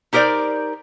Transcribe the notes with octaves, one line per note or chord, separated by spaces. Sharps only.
D#4 G4 A#4 C5 D5